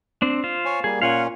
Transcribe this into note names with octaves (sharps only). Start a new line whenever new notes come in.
C4 D4
F4 C5
C#5 G#5
G3 A#3 G#4
A#2 C#4 F4 F5 F#5 G#5